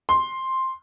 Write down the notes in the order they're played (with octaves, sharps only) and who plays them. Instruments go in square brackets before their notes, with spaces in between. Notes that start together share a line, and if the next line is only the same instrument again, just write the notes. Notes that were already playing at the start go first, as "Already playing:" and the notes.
[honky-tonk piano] C6